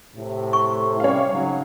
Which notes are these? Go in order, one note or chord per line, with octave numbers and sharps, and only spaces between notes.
A2 C3
C#6
C3 G3 C#4 C#5 F5
G#2 C#3 F#3